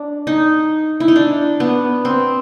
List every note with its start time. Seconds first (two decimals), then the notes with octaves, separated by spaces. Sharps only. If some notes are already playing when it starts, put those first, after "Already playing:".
Already playing: D4
0.27 D#4
1.00 E4
1.08 D#4
1.16 D4
1.60 B3
2.05 C4